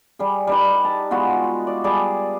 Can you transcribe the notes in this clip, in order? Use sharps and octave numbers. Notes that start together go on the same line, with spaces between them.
G3 G#4
G3 D#4 B4
A5
G#3 B3 F4 F#4
D5
G3 G#4 D5 A5